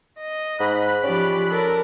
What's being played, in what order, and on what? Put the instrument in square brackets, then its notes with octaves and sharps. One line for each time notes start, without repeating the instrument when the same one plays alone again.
[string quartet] D#5
[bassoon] G#2 [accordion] B5 F#6
[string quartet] F3 G4 D5 [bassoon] C#4
[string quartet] A4 A#4 D5